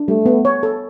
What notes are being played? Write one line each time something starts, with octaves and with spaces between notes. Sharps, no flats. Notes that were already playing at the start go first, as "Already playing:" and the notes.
Already playing: D4
G3 A3
B3
C#5
A4